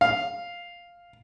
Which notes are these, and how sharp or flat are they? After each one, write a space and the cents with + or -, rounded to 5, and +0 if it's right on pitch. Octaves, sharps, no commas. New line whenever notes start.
F5 +0